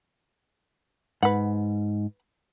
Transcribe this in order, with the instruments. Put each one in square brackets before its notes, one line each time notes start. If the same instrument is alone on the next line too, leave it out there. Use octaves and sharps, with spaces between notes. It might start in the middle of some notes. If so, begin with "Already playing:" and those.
[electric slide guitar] G#2 [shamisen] B4 F#5